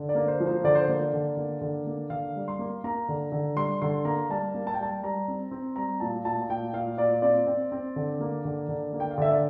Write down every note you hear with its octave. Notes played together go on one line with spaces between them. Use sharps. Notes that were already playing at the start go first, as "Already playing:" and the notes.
Already playing: D3
D5
A#3
C5
F3
C5
D3 D5
C5
A#3 D5
D3
A#3
D3
A#3
D3 F5
G3
C6
A#3
A#3 A#5
D3
D3
G3 C6
D3 C6
A#3 A#5
G3 A5
A#3
A5
G5
G3 A5
G3 A#5
C4
C4
G3 A#5
A#2 A5
A#2 A5
A5
A#2 G5
A#2 F5
A#2 D5
C4 D5
C4
C4
D3
A#3
D3
D3
A#3
G5
F5
D3 E5
D5